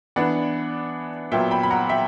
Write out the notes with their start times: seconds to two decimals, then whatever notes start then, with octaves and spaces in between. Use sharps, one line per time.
0.16 E3 B3 D4 D5 F#5
1.32 A#2 F#3 B3 E5 G5
1.51 G5 B5
1.63 B5
1.70 F#5 A#5
1.89 E5 G5